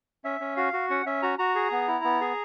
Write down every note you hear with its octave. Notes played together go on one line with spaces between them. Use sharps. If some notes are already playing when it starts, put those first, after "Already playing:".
C#4 E5
C#4
F#4 F5
F#4
C#4 F#5
C#4 E5
F#4 A#5
F#4 A#5
G#4
B3
E4
B3
G#4